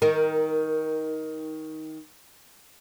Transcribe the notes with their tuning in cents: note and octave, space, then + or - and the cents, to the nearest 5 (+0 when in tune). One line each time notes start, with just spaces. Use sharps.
D#3 +15 A#4 -5